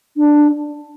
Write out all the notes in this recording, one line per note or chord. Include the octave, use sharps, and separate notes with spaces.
D4